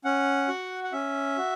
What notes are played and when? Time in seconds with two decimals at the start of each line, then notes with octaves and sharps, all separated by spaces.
0.05 C#4 F#5
0.48 F#4
0.84 F#5
0.92 C#4 E5
1.38 F#4